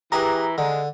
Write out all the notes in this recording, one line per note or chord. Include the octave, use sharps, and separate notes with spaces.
E3 G4 G#4 A#5
D3 G#3